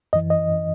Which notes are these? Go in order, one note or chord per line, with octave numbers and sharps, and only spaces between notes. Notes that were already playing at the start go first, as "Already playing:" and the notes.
F#2 E3 D#5
D#5